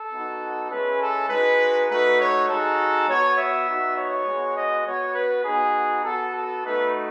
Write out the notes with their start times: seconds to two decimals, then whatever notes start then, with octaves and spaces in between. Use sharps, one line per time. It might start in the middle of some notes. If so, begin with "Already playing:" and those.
Already playing: A4
0.12 B3 D#4 F#4
0.71 G#3 C#4 E4 B4
1.00 A4
1.29 G#3 D#4 F#4 B4
1.88 A3 D#4 F#4 B4
2.19 C#5
2.48 G#3 D#4 F#4 A4
3.07 B3 F#4 C#5
3.37 E5
3.67 B3 D#4 F#4
3.96 C#5
4.26 G#3 B3 F#4
4.56 D#5
4.85 B3 F#4 C#5
5.15 B4
5.44 B3 D#4 F#4 G#4
6.03 B3 F#4 A4
6.34 A4
6.63 A3 D#4 F#4 B4